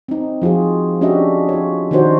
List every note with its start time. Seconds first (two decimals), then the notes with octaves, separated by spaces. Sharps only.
0.08 C4 D#4
0.42 F3 F4 F#4 G#4
1.01 C#4 D4 F#4 G4 D#5 E5
1.49 F4 C#5
1.91 D#3 D4 D#4 F#4 C5 C#5